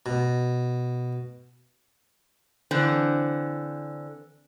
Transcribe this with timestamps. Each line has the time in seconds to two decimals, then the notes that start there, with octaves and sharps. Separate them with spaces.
0.06 B2
2.71 D3 E3 C4